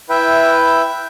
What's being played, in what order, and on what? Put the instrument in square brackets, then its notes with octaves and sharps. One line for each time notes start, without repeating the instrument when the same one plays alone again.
[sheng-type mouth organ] E4 B4 E5 G5